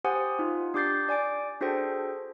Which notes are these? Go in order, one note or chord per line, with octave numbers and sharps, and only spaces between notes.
G4 C5 F#5 G#5 D#6
D#4 F4
D4 G4 D6 G6 A6 C7
D5 G#5 D6 D7
D4 F#4 G#4 A4 C5 G5